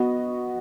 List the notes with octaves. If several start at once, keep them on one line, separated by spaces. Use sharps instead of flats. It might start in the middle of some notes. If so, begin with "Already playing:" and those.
Already playing: B3 F#4 D#5